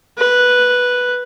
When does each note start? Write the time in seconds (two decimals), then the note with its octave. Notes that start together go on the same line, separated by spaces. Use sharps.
0.18 B4